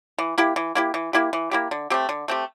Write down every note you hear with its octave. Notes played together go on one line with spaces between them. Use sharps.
E3
A#3 E4 G4
E3
A#3 E4 G4
E3
A#3 E4 G4
E3
A#3 E4 G4
D3
A3 C4 G4
D3
A3 C4 G4